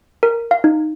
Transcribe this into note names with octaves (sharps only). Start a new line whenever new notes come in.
A#4
F5
D#4